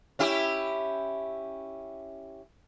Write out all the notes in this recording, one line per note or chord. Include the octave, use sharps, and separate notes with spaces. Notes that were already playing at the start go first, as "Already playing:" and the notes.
C#4 E4 G4